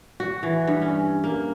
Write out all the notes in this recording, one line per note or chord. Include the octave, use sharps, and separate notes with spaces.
F#4
E3
G2
C#4
A#3